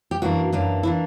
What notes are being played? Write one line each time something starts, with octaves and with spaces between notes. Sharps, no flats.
G4
F#2 E3 A#3 D4 F#4
F#2 E3 A#3 D4
E3 A#3 D4 E4